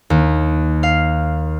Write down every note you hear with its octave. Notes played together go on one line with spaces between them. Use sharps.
D#2
F5